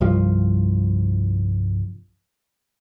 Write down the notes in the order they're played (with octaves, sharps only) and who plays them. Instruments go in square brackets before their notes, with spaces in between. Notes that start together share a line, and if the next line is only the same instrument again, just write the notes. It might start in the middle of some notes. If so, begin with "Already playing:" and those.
[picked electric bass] C2 G2 F3